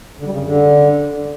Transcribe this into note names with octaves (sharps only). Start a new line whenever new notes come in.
D3
G3
C#3
F#2
D3